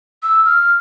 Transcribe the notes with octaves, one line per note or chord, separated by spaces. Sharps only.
E6
F6